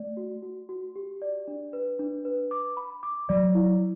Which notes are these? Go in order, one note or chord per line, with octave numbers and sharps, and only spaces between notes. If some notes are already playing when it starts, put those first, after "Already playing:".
Already playing: A3 D5
F#4
F#4
F#4
G4
D5
D4
B4
D4
B4
D6
B5
D6
F#3 D5
E4